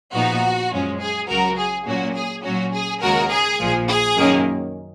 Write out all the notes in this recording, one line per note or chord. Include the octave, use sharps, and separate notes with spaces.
A#1 A#2 F3 B3 D#4 F#4
F#2 F3 G#3 C#4
G#4
C#2 C#3 F#3 F#4 A#4
G#4
A#2 F#3 A#3 C#4 F#4
G#4
A#2 F#3 C#4 F#4
G#4
D#2 C#3 G#3 F#4 A#4
G#4
A#1 A#2 F3
G#4
F#2 D#3 A#3 C#4